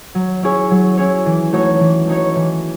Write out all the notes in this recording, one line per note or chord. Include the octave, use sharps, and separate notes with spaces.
F#3
C#4 E4 G#4 C#5
F#3
C#4 E4 G#4 C#5
E3
A3 D#4 F#4 C#5
E3
A3 D#4 F#4 C#5
E3